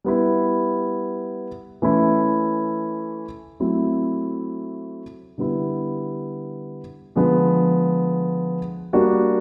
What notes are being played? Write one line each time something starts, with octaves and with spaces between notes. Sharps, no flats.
G3 B3 E4
E3 A3 C#4 E4
F#3 A3 C4 E4
D3 G3 B3 E4
D3 F3 G#3 B3
G3 A#3 D4 F#4